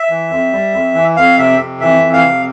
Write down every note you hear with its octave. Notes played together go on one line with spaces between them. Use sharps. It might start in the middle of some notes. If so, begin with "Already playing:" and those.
Already playing: E5
E3
F2
G3
F2
E3
F2 F5
C3 E5
F2
E3 E5
F2
F5
C3